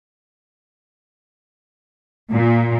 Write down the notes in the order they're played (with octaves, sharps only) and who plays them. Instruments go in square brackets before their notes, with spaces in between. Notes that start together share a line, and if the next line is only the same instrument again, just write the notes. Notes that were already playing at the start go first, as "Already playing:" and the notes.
[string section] A#2